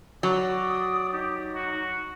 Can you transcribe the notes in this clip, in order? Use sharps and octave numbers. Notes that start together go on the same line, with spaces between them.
F#3 D5
D#6
D#4 G4
F#4